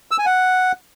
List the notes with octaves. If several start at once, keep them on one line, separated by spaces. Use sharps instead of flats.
E6
G#5
F#5